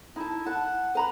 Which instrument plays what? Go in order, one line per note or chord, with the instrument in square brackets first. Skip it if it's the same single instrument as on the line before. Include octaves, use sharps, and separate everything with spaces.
[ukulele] D#4 A5 [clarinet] E4
[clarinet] F#5 [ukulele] A5
[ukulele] B4 A#5 B5